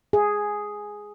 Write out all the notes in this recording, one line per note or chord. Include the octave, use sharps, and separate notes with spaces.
G#4